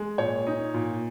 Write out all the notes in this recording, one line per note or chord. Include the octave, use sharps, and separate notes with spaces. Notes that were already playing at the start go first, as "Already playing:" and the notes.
Already playing: G#3
A#2 C#5
D#4
A#2